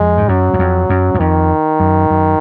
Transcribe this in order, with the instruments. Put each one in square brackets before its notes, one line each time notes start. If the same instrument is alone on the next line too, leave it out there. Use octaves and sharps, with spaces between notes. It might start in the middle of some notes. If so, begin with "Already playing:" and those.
Already playing: [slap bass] F2 [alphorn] G#3
[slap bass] G#2
[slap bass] F#2 [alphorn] F#3
[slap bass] F#2
F2
F#2
F#2
[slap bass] F2 [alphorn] D#3
[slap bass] F#2
F#2